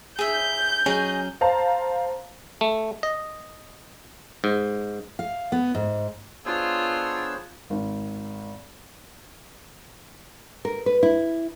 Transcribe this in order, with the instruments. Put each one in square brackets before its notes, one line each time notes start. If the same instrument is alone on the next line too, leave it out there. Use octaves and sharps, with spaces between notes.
[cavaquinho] G#4 E5 [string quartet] G6
[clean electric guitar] F#3 C#4 [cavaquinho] G#4 D#5
[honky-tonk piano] C5 F5 A5 A#5
[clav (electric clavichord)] A3
D#5
G#2
[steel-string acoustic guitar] F5
B3
G#2
[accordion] B3 D4 E6 [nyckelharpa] F4 [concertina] G#4 C5 C#5
[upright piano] G#1
[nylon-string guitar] A#4
B4
E4